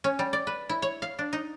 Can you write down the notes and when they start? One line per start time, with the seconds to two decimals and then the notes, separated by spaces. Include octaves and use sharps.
0.04 C#4
0.19 G3
0.33 D5
0.47 B4
0.69 E4
0.82 C#5
1.02 F5
1.19 D4
1.33 D#4